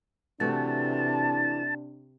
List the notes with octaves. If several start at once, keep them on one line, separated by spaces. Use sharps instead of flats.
C3 E3 A3 D4 F#4 A5